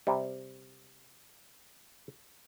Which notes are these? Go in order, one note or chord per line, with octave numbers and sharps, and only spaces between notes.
C3 G3